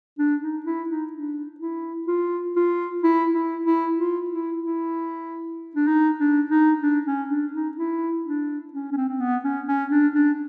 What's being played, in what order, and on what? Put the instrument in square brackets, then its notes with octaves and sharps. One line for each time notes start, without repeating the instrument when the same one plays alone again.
[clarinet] D4
D#4
E4
D#4
D4
E4
F4
F4
E4
E4
E4
F4
E4
E4
D4
D#4
D4
D#4
D4
C#4
D4
D#4
E4
D4
C#4
C#4
C4
C4
B3
C#4
C#4
D4
D4